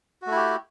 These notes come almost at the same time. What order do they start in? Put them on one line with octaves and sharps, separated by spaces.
F#4 A3 E4 G4